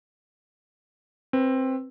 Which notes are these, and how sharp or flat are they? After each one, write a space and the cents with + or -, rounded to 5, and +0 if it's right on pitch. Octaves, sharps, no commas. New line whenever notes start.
C4 +10 B4 +0